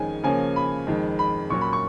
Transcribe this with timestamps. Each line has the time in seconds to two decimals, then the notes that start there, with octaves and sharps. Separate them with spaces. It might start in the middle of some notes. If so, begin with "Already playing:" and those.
Already playing: F2 D#3 G#3 C#4 G#5
0.24 C#3 F3 A#3 C#4 G#5
0.56 B5
0.87 F2 D#3 G#3
1.19 B5
1.50 A#2 F#3 C#4 C#6
1.61 B5
1.73 C#6